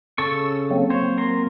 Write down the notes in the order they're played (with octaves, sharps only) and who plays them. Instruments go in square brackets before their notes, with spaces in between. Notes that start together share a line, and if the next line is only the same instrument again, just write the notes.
[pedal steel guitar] C#3 A4 C#6 [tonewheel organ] E6
[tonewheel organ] F#3 A#3 C4
[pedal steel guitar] C5 C#5
A#4 C6